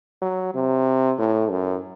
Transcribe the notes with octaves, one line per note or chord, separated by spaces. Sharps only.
F#3
C3
A2
F#2